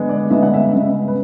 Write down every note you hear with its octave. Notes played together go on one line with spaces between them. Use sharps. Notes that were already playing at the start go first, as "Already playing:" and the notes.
Already playing: D3 G#3 B3
D5
D3 G#3 B3 E5
F#5
E5
C#3 G#3 B3 E5
B4